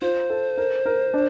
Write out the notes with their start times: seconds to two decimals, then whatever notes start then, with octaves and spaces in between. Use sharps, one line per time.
0.02 F4 C5
0.30 A4
0.58 A#4
0.86 A#4
1.14 D4